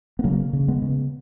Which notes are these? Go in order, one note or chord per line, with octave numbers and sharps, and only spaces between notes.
B3
C#3 F#3 A#3
C#3
G#3 B3
C#3